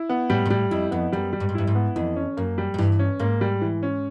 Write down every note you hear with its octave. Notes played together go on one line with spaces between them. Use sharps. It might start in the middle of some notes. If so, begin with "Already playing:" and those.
Already playing: E4
B3
A2 G3
A#2
A2 G3
F2 E4
F2 B3
F#2 G3
G3
G2
G#2
G2 E4
G#2
B3
F2 E3
C#4
F#2 A#3
G3
G#2
G2 E3
C#4
G#2 A#3
G3
E3
C#4